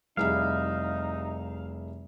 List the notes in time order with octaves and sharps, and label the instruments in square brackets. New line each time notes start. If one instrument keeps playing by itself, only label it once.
[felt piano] F1 G#4 E5 [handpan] G3 E4 [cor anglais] D#4 [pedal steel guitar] F5